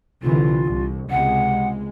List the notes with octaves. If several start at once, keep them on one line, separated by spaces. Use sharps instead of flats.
C2 D3 E3 F4
C2
C#2 C3 G#3 F#5